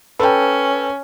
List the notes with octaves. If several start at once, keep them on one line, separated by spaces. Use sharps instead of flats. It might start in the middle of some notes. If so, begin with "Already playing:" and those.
C#4 A4 B4 G5